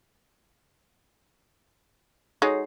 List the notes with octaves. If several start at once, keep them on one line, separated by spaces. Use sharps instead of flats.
G#3 D#4 F#4 A4 C#5 C7